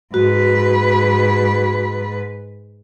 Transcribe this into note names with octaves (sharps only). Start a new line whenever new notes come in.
G#2 F#4 B4